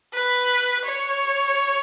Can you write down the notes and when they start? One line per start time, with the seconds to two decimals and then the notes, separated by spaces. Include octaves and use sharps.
0.14 B4
0.85 C#5